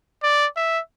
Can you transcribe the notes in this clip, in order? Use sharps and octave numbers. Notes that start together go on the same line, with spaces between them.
D5
E5